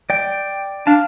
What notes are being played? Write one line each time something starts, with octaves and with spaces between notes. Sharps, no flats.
D5 G5
D4 F5 A5